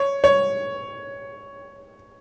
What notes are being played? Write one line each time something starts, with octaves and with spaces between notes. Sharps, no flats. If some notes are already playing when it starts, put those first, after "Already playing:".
Already playing: C#5
C#5